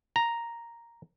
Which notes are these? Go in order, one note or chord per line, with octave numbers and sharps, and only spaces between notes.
A#5